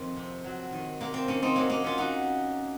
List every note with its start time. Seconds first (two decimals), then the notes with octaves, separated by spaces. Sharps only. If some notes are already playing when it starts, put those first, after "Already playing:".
Already playing: F2 D#3 C4
0.16 C3
0.44 F#3
0.72 D#3
1.00 C3 A#3
1.14 C4
1.28 D#3 A#3 C#4
1.42 C4 D#4
1.56 F#3 A#3 C#4
1.70 A#3 C#4
1.82 F#3 C#4 F4
1.98 D#4 F#4